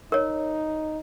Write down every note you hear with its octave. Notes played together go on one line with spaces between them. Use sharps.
D#4 A#4 C#5